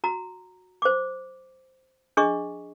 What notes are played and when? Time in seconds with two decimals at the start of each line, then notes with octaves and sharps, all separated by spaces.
0.04 F#4 A#5
0.82 C5 D6
2.17 D4 G#4 D#5 C#6